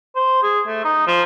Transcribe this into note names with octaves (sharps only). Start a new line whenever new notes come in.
C5
G#4
A3
D#4
F3